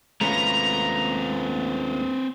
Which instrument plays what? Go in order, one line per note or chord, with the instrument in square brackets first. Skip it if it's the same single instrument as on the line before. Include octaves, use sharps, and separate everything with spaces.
[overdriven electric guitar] D#2 G#3 [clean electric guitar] A3 C#4 F4 [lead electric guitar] C4 B4 [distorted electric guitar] A#5